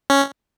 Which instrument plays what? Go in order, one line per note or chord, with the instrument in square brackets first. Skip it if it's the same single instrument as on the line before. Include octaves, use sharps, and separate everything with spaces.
[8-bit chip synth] C#4